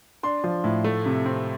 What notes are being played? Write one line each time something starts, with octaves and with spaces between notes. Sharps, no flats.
D4 C6
F3
A2
A3
C3
C4